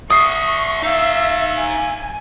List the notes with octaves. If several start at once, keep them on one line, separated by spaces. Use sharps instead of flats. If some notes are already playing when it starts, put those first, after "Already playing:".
D5 E5 C#6 D#6 C7
D#4 E5 F5
G#5